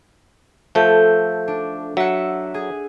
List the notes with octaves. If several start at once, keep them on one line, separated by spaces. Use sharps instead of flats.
F3 A3 A4 G6
D4
F#3 E5 F#5
G#4